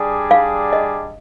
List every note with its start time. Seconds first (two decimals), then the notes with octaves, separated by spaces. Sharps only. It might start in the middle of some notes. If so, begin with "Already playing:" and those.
Already playing: G3 D4 G#4
0.31 F5
0.73 D#5